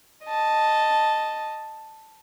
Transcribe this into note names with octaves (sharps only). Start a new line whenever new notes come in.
D#5 A5